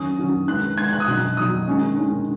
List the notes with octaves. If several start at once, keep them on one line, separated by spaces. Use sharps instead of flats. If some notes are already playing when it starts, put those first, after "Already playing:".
Already playing: D#3 F#3 C#4 D#6
D#3 F#3 C#4
D#3 G#3 B3 F#6
D#3 G#3 B3 G#6
F#6
D#6
B2 F#3 D#4 F#6
B2 F#3 D#4 D#6
D#3 G#3 C#4
D#3 G#3 C#4